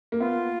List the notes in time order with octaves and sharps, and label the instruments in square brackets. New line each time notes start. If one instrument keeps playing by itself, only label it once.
[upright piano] A#3
[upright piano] B3 [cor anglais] F4